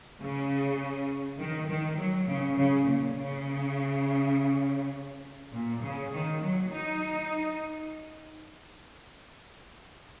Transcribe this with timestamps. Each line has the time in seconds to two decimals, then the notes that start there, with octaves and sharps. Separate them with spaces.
0.19 C#3
1.38 D#3
1.67 D#3
1.97 F#3
2.27 C#3
2.56 C#3
2.85 A#2
3.15 C#3
5.52 A#2
5.81 C#3
6.12 D#3
6.41 F#3
6.70 D#4